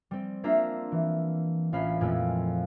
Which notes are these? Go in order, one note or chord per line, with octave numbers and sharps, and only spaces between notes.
G3 C4
A#3 D4 F4 E5 A#5
E3
A1 C#4 F4 F5 B5
F2 A#2 G#3 A3 C4 E4